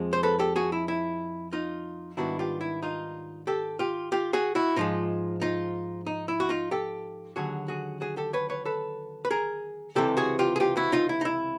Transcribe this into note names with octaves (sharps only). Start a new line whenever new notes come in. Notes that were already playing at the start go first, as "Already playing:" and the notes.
Already playing: F2 F3 G#3 C4
C5
A4 B4
G4 A4
F#4 G#4
E4
E4
D#4 F4
G#2 D#3 G3 B3 D4 E4 F#4
F4 G4
E4
D#4 F4
G4 A4
F4 G4
F4 G4
F#4 G#4
E4 F#4
G#2 F3 G#3 D#4 F4
D#4 F4
D#4
E4
F#4
D#4 F4
G4 A4
D#2 D3 F#3 F#4 G#4
F#4 G#4
F#4 G#4
G4 A4
B4 C#5
B4 C#5
A4 B4
B4
G#4 A#4
C#2 C3 E3 G4 A4
F#4 G#4
F4 G4
G#4
F4 G4
E4 F#4
D#4 F4
E4
D#4
E4